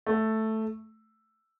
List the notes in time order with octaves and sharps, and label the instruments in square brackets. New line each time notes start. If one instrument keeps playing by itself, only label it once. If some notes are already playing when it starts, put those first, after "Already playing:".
[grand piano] A3